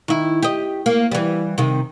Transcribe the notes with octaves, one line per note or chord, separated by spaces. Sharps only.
D#3 E4
G4 D#5
A#3
E3 G3
C3 D#3